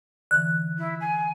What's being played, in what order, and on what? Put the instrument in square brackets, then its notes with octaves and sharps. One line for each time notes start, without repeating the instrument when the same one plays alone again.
[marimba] D3 E3 [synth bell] F#6
[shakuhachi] E4
G#5